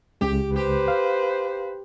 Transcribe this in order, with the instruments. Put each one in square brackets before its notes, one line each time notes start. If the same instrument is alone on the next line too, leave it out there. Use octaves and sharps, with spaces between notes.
[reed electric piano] C#2 C#3 G#3 [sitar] G4
[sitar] G4 [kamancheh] B4 C5
[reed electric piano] F5